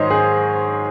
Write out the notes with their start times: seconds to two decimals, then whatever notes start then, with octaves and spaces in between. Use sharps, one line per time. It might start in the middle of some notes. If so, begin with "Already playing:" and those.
Already playing: G#2 D#3 F#3 C5 C#5 D#5
0.10 G#4 C5